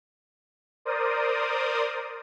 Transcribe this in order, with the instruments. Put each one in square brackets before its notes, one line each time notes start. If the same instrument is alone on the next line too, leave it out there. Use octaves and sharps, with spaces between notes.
[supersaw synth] A#4 C5 D5 D#6